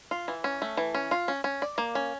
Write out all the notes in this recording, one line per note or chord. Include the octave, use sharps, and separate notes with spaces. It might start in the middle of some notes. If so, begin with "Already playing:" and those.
F4
E3
C#4
A3
E3
C#4
F4
C#4
C#4
D5
A#3
C#4